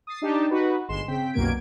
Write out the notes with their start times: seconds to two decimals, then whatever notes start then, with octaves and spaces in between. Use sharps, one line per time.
0.07 D#6 A6 C7
0.22 D4 D#4 G4 A5
0.50 D#4 F#4 B4
0.89 G1 G#3 C6 E7
1.08 C#3 C4 G5 B6
1.33 C2 F#2 B2 A#3 G#6 D7